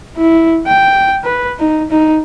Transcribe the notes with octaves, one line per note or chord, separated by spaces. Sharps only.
E4
G5
B4
D#4
D#4